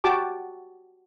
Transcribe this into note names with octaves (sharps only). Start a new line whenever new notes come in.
F#4 G4 A5 D6